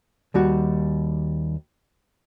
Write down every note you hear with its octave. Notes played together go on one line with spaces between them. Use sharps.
D#2 G3 F#4